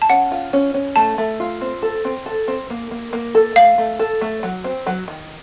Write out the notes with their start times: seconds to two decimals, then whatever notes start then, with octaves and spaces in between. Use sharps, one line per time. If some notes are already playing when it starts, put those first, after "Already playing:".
0.02 A5
0.10 C#4 F#5
0.31 F4
0.53 C#4
0.74 C#4
0.96 A3 A5
1.18 A3
1.40 F4
1.61 C4
1.83 A4
2.05 C4
2.26 A4
2.48 C4
2.70 A#3
2.91 A#3
3.13 A#3
3.35 A4
3.56 A3 F5
3.78 A3
3.99 A4
4.21 A3
4.43 F#3
4.64 C4
4.87 F#3
5.08 D#3